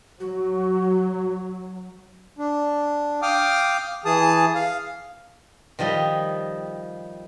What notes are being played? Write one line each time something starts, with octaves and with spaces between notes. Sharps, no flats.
F#3 F#4
D4
F5 G5 D6 D#6 F6
E3 G#4 A5 D#6
F5
D#3 F3 G3 D#5